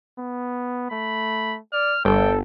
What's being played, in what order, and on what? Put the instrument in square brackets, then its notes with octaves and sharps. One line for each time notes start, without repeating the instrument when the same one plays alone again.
[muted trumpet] B3
[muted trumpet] A3 [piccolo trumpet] B5
[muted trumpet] D5 [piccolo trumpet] F6
[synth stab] G1 [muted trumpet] A4 [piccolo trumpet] G5